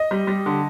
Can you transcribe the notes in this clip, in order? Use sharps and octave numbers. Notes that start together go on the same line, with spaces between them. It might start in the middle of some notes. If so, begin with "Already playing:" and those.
Already playing: D#5
G3
G3
D3